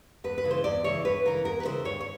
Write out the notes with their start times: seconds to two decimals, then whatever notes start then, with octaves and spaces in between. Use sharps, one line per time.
0.24 E2 B4
0.38 B4
0.44 C#3 E3
0.51 C5
0.64 E2 D5
0.84 C#3 E3 C#5
1.05 E2 B4
1.25 C#3 E3 A#4
1.45 E2 A#4
1.60 B4
1.65 C#3 E3 C5
1.85 D#2 C#5
2.00 C#5